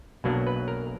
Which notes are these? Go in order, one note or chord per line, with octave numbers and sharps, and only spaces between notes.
B1 B2 F#3 A#3 D4
B4
A#4